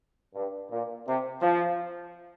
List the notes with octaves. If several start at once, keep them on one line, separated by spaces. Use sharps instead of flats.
G2
A#2
C3
F3